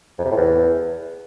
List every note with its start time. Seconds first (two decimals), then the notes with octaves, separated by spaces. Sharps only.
0.18 F2
0.24 C3
0.31 A2
0.37 E2